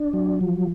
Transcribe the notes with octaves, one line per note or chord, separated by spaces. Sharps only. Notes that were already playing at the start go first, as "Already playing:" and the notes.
Already playing: D4
F#3
F3